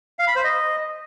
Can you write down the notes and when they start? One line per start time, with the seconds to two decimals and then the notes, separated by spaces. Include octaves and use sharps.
0.19 F5
0.27 B5
0.36 C5
0.44 D#5